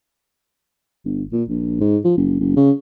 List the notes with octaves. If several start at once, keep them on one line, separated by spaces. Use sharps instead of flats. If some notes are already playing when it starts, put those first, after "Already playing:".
G1
A#2
A#1
G#2
F3
F#1
F#1
C#3